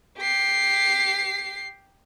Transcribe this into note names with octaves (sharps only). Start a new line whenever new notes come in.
G4 C7